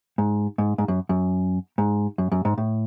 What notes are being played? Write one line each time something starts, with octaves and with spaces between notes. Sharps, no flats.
G#2
G#2
G#2
F#2
F#2
G#2
F#2
F#2
G#2
A2